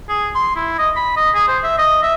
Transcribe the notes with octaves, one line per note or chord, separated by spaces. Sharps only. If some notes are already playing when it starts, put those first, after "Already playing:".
G#4
C6
E4
D#5
B5
D#5
G#4
C5
E5
D#5
E5